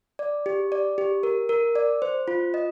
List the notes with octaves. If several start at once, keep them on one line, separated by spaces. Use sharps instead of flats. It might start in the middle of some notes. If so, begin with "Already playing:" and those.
D5
G4
D5
G4
A#4
A#4
D5
C5
F4
D#5